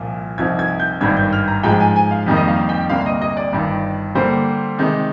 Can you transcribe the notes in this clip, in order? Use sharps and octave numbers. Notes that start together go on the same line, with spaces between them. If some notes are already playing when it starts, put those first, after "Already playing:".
Already playing: C2 A#2 F3
C2 C3 F3 C4 D#4 G#6
G#6
G6
G#1 G2 D#3 G3 D4 G#6
G6
F6
A#5
G#2 F3 G#3 G5
G#5
G#5
F5
F2 D#3 G3 A#3 D#4
D#5
F5
G5
D2 C3 G3 A#3 D4 F5
D#5
D#5
D5
G1 G2 D#3 G3
D3 G3 A#3 C5
C3 D#3 G#3 D#4